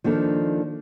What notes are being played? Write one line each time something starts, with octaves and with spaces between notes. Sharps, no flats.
D#3 F3 A#3 D4 A4